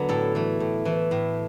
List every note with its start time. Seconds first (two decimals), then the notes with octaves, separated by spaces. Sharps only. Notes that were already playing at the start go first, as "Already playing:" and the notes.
Already playing: D3 F#3 B3 D4
0.09 A2 A4
0.35 E3 A3
0.60 A2
0.85 E3 A3
1.11 A2